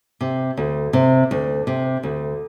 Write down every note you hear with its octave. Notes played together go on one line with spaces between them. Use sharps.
C3
D2
C3
D2
C3
D2